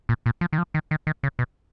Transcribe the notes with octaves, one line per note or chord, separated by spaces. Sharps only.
A#2
A#2
F3
D#3
F3
D#3
D#3
D#3
C#3
B2